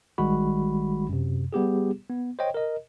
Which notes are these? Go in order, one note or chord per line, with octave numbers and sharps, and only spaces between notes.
G#1 D#3 G3 G#3 F#4 B5
F#2 C3
G3 B3 G4 G#4
B3
C5 C#5 D#5 G5
A#4 D#5